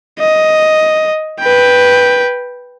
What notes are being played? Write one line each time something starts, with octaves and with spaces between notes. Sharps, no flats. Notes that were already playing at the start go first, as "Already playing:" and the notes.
D#5
B4 G5